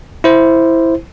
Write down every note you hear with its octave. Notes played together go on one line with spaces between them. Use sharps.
E4 C5